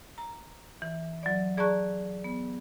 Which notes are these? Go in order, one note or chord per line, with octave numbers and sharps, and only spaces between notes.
A#5
E3
F#3 D5
G#4 D5 A5 A#5 C#6 F#6
B3